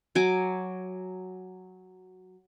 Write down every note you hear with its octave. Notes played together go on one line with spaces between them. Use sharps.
F#3 G#5 D6